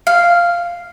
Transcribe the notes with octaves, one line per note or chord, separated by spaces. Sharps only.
F5